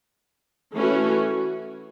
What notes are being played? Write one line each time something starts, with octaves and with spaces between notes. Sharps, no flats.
E3 A3 C#4 F#4